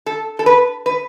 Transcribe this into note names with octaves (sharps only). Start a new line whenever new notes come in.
A4
A4
B4
B4